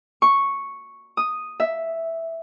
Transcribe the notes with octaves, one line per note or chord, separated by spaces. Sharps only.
C#6
D#6
E5